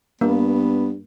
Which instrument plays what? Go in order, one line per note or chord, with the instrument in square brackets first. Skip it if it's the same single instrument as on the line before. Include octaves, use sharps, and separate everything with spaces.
[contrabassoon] G2 [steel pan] A#3 [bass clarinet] B3